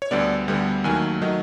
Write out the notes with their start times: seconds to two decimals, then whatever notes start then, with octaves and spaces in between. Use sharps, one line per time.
0.02 C#5
0.11 D2 D3 G3 B3 D5
0.48 D2 D3 G3 B3
0.84 D#2 D#3 F#3 A3 G#5
1.21 D#3 F#3 A3 D#5